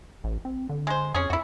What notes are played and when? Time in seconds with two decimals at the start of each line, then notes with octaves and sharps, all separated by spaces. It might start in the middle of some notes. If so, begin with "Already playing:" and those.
0.24 A1
0.45 C4
0.69 D3
0.87 G#3 C5
1.14 F2 C#4 G#4
1.30 F2 E4 F#4